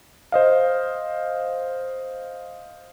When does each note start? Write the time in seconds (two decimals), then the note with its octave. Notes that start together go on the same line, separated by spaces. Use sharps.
0.32 C5 D#5 F5